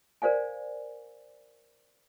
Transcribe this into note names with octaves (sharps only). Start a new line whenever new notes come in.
A#4 C5 D5 F5 G#5